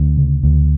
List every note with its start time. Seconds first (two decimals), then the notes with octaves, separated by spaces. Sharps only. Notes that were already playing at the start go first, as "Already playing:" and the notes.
Already playing: D2
0.17 C#3
0.43 D2